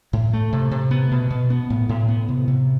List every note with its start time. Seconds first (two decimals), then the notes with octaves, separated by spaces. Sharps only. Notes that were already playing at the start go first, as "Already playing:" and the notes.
0.13 A2
0.33 A3
0.53 C3
0.71 C3
0.91 B3
1.12 B2
1.31 B2
1.50 B3
1.70 A2
1.89 A2
2.08 B3
2.29 C3
2.48 C3